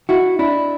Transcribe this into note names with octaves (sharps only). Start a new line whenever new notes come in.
E4 F#4
D4 E4